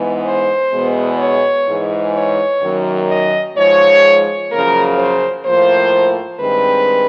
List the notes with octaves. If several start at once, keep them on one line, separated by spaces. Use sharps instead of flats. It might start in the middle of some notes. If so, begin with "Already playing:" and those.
Already playing: G#2 E3 G#3 B3
C5
E2 B2 G#3 B3
C#5
G#2 E3 G#3
C#5
F#2 D#3 F#3 A#3
D#5
G#2 F3 G#3 C#5
F#2 C#3 F3 A#3 A#4
C5
A2 F3 A#3 C5
G2 D#3 G#3 C4 B4